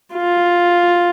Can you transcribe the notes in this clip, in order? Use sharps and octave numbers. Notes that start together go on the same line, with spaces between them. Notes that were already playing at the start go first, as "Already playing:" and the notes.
F4